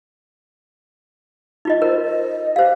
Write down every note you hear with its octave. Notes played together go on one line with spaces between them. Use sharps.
D#4 F4 D#5
A#4 C5
D#5
G4 C5 F5